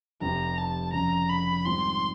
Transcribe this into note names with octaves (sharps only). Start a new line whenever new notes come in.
F1 F2 C3 A#5
A5
F1 F2 C#3 A#5
B5
G#2 D#3 G3 C4 F4 C6